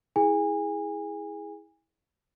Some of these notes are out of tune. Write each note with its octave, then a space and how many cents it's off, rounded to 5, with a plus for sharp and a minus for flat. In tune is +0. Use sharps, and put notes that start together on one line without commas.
E4 -20 G#4 +0 G#5 -30